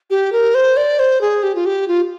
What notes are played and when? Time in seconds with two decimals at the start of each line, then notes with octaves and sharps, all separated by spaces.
0.10 G4
0.33 A#4
0.55 C5
0.77 D5
0.99 C5
1.21 G#4
1.43 G4
1.55 F4
1.66 G4
1.88 F4